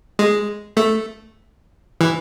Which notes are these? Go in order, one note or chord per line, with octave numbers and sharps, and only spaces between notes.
G#3
A3
E3